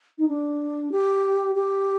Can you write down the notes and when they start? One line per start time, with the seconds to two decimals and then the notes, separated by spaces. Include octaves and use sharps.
0.18 D#4
0.28 D4
0.92 G4
1.55 G4